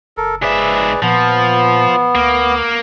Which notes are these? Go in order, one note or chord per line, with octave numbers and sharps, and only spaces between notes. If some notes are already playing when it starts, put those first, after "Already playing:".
F#1 A4 A#4
G#2 G#4 B4 D5 E5
A#2 F3 B3
D2 A#3